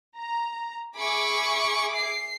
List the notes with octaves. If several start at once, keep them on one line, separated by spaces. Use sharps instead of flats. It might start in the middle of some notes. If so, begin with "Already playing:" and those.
A#5
G#4 E5 B5 C#6 D6
C7